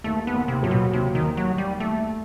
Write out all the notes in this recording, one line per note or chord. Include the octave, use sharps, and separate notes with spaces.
D#2 A3
B3
D#2
C3
A2 F#3
B2
D#2 C3
D#3
D#2
F#3
D#2
G3
D#2 A3